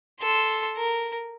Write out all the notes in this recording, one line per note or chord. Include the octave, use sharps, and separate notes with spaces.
A4 C6
A#4